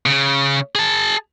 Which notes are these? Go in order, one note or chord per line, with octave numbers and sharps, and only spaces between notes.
C#3
G#4 A5